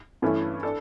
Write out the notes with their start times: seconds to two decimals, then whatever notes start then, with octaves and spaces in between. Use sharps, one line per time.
0.22 G2 E3 A3 C#4 E4
0.63 D4 A4